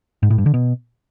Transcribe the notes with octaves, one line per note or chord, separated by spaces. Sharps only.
G#2
A2
G2
D3
B2